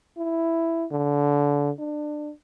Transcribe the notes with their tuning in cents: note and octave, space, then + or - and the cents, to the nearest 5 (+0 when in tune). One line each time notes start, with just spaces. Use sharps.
E4 +5
D3 -25
D4 +25